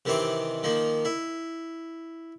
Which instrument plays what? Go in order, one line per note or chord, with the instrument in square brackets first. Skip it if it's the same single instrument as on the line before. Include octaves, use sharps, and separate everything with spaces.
[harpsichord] C3 D#3 E3 C4 D6
D#3 F3 A#3
E4